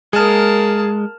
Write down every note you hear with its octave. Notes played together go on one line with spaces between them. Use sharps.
G#3 A#3 G#4 A5 F6